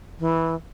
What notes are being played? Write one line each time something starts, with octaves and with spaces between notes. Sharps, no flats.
E3